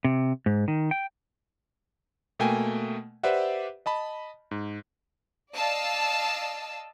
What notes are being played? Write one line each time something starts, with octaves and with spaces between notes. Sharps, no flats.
C3
G#2
D#3
G5
B2 A3 A#3 G5 G#5
G4 B4 C5 D5 E5 F#5
D#5 A5 B5
G#2
D5 D#5 F5 A5 E6